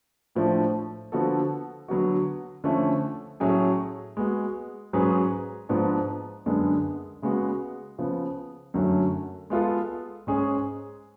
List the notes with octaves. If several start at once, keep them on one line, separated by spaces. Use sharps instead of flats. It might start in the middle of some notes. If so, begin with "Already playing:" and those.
A2 F3 A3 D4
D3 F3 B3 F#4 A4
D3 F#3 B3 F#4
D3 F3 A3 C#4
A2 F#3 A3 C#4 G#4
G#3 B3 F#4
G#2 F#3 C#4 G#4 B4
G#2 F3 B3 D4
F#2 D3 G#3 B3 D4
C#3 G#3 B3 F#4
C#3 F3 B3
F#2 D3 F#3 A3 C#4
G#3 B3 F4 A4
G#2 G#3 C#4 G#4